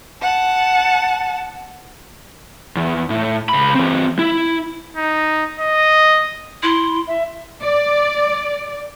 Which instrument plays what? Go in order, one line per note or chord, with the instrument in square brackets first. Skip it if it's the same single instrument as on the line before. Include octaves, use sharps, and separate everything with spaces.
[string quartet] F#5 A5
[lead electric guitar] E2
A2
C#2 B5
E3 C4
E4
[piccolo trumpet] D#4
D#5
[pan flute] E4 [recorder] C6
[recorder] E5
[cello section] D5